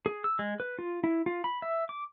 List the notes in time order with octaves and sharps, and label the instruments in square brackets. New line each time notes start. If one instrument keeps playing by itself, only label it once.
[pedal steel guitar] G#4
E6
G#3
B4
F4
E4
F4
B5
E5
D6